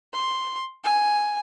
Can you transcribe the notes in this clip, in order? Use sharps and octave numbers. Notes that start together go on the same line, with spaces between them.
C6
G#5